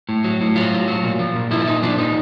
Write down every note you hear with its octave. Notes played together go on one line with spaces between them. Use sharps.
A2
F#3
A2
F#3 F4
A2
F#3
A#2
F3
A#2
F3 E4
A#2 D#4
F3 D4
A#2 D#4